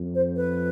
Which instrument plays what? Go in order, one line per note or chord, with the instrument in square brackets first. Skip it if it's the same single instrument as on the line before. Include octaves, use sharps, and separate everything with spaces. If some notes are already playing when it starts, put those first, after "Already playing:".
Already playing: [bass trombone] F2
[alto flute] C5
B4